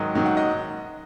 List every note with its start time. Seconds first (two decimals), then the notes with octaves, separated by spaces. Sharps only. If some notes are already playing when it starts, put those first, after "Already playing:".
Already playing: G#2 D#3 F#3 D#5
0.15 G#2 D#3 F#3
0.26 F#5
0.37 D#5